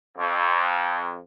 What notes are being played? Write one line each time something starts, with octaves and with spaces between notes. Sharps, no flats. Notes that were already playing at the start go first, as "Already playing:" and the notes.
F2